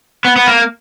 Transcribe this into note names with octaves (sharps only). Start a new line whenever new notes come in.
B3
B3
A#3